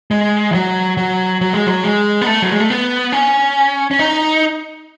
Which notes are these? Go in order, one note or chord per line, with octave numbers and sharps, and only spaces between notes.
G#3
E3
F#3
F#3
F#3
G#3
F#3
G#3
B3
A3
F#3
G#3
A3
B3
C#4
C#4
D#4